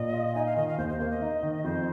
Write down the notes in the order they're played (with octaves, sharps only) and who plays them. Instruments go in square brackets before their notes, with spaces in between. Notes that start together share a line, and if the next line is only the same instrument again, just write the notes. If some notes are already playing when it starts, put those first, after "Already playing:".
Already playing: [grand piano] A#2 [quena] D#5
[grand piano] F4
[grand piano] D#4 [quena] G#5
[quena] F5
[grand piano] D#3 [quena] D#5
[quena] F5
[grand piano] D#2 [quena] C5
[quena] C5
[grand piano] A#3 [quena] C5
[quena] D#5
[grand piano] D#4
D#3
[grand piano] F2 [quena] C5